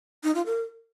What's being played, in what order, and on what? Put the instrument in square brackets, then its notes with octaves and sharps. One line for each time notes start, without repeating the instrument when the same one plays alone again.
[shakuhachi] D#4
F4
A#4